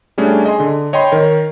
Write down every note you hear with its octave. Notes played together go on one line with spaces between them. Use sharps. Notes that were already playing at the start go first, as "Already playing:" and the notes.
G3 A3 C#4 D4 G#4
G#4 D#5 G#5 C6
D3
C#5 D#5 G5 B5 C6
D#3 A#4 C#5